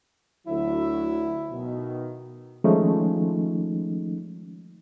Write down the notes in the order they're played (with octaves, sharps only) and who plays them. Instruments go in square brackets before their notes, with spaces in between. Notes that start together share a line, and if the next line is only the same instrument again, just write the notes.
[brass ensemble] D2 F#3 E5 [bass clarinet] E4
[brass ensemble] B2 D#3
[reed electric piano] D#3 F3 G#3 A3 C#4 D#4